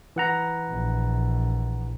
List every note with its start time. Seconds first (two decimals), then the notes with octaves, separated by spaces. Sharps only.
0.16 E3 F#5 A#5
0.70 A#1